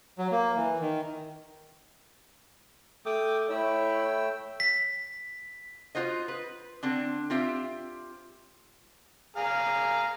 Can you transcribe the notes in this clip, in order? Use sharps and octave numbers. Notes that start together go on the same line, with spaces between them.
F#3
A#3
E3
D#3
A3 G5 D6 D#6
A3 E4 C#5 G5 E6
B6
F4 F#4 C5 D#5
B4
D3 C4 D4
C4 F4 G4 E5
G#4 F5 A#5